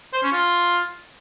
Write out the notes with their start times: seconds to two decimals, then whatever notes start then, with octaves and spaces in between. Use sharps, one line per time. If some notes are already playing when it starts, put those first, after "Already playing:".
0.13 C5
0.23 C#4
0.32 F4